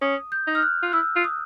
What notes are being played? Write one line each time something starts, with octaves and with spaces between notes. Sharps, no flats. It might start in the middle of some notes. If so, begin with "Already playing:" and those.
C#4 D#6
G6
D#4
F6
F#6
F4
E4 E6
F4
D#6